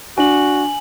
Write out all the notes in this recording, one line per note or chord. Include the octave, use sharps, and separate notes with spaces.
D4 F#4 G#5 F#7